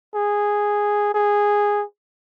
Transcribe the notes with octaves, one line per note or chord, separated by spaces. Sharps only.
G#4
G#4